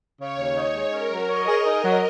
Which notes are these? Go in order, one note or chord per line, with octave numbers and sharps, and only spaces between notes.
C#3 C#5
D#2
D#4
G#3
C#4 A#4
F#3
C#5 D#5
G#4
D#4
F#3